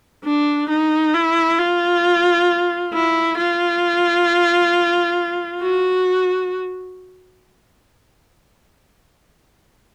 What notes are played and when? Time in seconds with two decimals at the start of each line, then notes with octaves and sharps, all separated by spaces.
0.24 D4
0.69 D#4
1.14 E4
1.59 F4
2.93 E4
3.38 F4
5.62 F#4